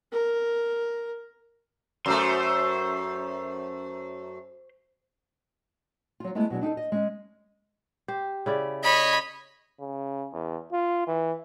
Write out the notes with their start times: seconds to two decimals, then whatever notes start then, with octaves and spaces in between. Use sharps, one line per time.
0.13 A#4
2.06 F#2 A3 C5 C6
6.20 F#3 F4
6.35 G#3 A3 B3 E4 G#4
6.50 B2 F#3 G#3 D4
6.61 D4 D#4 G4 A4
6.77 D#5
6.92 G#3 C#4
8.08 G4 C5
8.46 C#3 E4 D5
8.84 C#5 D#5 B5
9.80 C#3
10.33 E2
10.72 F4
11.07 E3